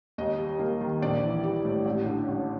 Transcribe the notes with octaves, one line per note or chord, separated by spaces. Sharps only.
D#2 D#5
G3
A#3
D#3
A#1 D5
E3
G3
A2
A1
D3
A1